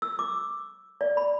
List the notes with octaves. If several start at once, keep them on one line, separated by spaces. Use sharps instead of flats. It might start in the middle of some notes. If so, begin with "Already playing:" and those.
E6
D6
D5
B5